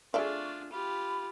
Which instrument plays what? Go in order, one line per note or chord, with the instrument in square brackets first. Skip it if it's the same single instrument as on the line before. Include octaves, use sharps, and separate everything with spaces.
[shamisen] A3 D5 F5 [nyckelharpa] D4 F4 [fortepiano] G#4 E5 [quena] C#6
[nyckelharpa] F4 G4 [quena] B5